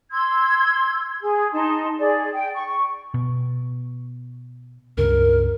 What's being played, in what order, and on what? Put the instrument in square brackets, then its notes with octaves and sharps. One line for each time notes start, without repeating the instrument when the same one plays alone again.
[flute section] C6 E6 G#6
G#4
D#4 A5 C6
G#4 D5
G5
C#6
[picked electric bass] B2
[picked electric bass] C#2 G2 C#3 [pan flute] A#4